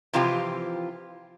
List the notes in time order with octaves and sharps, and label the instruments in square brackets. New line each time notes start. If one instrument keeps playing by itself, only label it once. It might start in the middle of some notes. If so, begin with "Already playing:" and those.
[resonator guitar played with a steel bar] C3 E3 F3 F4 G4